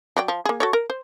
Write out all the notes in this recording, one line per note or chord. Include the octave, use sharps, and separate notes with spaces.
F#3 D5 G5
F3
A#3 G#4
F#4 A4 C#5
A#4
C5